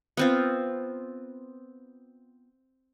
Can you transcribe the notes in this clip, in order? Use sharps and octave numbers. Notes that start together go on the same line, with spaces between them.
B3 C4 F4